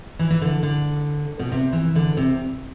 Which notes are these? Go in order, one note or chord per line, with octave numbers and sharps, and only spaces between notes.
E3
E3
D3
D3
B2
C3
E3
D3
C3